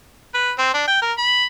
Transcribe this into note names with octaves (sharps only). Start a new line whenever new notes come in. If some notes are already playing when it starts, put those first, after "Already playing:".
B4
C4
D4
G5
A#4
B5